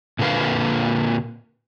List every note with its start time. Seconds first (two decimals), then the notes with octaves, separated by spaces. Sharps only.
0.19 A#2 D3 A#3 B4 F5